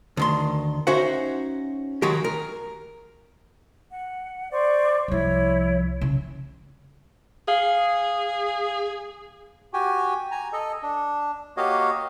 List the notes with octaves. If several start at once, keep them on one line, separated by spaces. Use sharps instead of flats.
D2 D#3 C6
C#4 D#4 F#4 C5 E5 F#5
D#3 F#3 G#3 F#4 G4 A#4
A#4
F#5
C5 D5 C#6
C2 F3 E4 C#5
C#3
G#4 F5
F#4 G4 G5 G#5
G#5 A#5
A4 D#5
D4
A#3 F#4 G4 C#5 D#5 F5